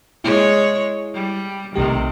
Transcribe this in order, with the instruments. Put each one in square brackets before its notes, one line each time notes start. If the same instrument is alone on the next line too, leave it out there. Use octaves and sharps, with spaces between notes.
[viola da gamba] G#3 C#5 [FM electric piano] E4 G#4
[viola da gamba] G3
[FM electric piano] B1 A3 G4 [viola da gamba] C3 D#3